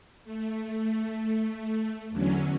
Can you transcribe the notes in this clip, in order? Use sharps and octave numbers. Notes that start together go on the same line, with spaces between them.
A3
E2 D3 F#3 C#4